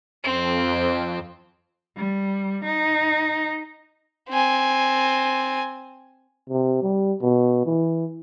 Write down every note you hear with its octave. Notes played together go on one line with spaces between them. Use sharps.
F2 C4
G3
D#4
C4 G#5
C3
G3
B2
E3